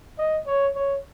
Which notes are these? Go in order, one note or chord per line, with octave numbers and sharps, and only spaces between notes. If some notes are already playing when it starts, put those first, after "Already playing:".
D#5
C#5
C#5